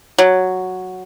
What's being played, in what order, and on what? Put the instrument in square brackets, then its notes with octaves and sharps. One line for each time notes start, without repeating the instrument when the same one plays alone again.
[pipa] F#3